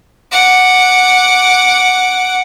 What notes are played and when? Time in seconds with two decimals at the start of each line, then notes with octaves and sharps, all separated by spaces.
0.31 F#5 D6